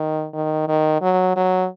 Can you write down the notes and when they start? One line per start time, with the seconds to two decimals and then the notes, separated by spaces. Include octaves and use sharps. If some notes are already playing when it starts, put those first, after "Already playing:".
Already playing: D#3
0.33 D#3
0.68 D#3
1.01 F#3
1.36 F#3